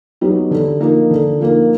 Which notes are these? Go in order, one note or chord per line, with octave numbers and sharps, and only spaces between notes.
F#3 B3 D#4 G4
D3
F3 A#3 D#4
D3
F3 A#3 D#4